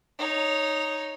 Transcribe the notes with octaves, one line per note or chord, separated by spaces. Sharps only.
D#4 C#5